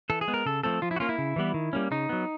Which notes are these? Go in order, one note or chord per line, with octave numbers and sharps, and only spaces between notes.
E3 A4
G#4
G#3 B3
A#4
C#3 A4
F3 A3 C4 A4
F3 F4
E4
F#4
A#3 C#4 F4
E4
C#3
E3 G3 B3
D#3
G3 A#3 C#4
C#3 D#4
F#3 B3